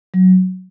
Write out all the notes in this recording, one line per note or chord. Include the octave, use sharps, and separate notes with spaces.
F#3